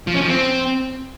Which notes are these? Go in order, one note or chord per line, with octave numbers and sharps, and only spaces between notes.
F3
C#4
F3
C4